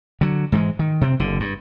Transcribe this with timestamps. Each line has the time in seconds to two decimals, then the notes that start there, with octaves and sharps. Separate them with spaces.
0.21 D3 F#3
0.52 G#2 E3 F3 G#3
0.79 D#3
1.01 C3 C4
1.20 F#1 D3
1.40 G2